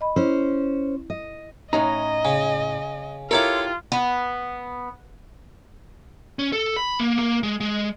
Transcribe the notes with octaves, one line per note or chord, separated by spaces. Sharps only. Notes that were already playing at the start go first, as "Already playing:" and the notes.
D#5 B5
C#4 E4 C5
D#5
A2 C#4 D#4 D#5 A#5
C#3 G#5
E4 F4 G4 A4 A#4 C#5 D6
B3
C#4
A4
B5
A#3
A#3
G#3
G#3